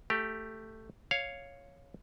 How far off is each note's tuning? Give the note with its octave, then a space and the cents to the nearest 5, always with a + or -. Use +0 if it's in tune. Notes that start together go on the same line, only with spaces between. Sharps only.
A3 +5 G4 +0
C#5 +0 F5 +0